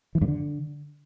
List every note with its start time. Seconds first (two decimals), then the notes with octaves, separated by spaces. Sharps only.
0.15 E3
0.21 G2
0.28 D3